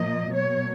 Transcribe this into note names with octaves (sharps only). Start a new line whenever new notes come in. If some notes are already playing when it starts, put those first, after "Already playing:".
Already playing: A#2 F3 A#3 D#5
B2 F#3 A#3 C#5